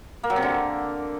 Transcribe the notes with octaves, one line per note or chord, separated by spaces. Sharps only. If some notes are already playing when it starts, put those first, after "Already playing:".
A#3
F#3
C3
D3